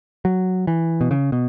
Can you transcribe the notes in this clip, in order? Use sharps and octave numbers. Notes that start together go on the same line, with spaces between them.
F#3
E3
B2
C#3
B2